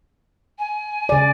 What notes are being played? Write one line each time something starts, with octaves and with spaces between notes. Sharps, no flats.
G#5
C#3 D5